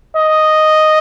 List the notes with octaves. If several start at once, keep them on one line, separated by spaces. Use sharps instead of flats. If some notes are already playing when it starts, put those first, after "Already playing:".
D#5